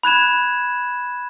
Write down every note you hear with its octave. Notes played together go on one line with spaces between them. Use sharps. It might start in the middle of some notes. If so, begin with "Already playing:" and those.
B5 F#6 G#6 E7